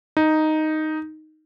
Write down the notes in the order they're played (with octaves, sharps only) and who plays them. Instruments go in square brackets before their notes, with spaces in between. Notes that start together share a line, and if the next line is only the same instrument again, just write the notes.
[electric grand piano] D#4